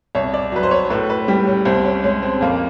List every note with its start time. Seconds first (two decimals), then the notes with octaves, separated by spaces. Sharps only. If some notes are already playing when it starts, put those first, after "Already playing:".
0.15 C2 C#5
0.34 D5
0.52 F#3 B4
0.63 C5
0.71 C#5
0.90 A2 B4
1.10 B4
1.28 G3 G4
1.47 C#4
1.65 C2 C4
1.85 C#4
2.04 G#3 C#4
2.22 C4
2.41 F2 A#3